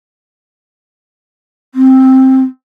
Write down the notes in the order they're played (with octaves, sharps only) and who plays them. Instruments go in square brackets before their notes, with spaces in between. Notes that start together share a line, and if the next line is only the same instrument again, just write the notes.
[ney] C4